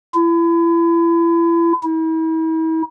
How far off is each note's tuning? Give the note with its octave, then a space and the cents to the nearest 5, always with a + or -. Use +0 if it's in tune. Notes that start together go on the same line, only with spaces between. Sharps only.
E4 +35
E4 -40